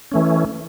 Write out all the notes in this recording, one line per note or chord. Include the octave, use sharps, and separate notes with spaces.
E3 A3 C#4